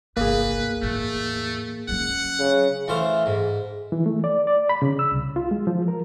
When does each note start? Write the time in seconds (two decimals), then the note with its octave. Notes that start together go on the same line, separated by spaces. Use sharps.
0.17 G1 C2 A#3 G#4 B4
0.82 E2 A2 A3
1.88 F#3 C#4 F#5
2.40 C#3
2.88 E3 A3 C5 F5
3.26 G#2
3.92 E3
4.06 A3
4.24 D5
4.47 D5
4.69 B5
4.82 C#3
4.99 E6
5.11 C2
5.36 F4
5.51 G#3
5.67 F3
5.88 A#4